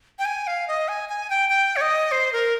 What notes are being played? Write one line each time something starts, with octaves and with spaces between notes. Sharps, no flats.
G5
G#5
F5
D#5
G#5
G#5
G5
G5
C#5
D#5
C5
A#4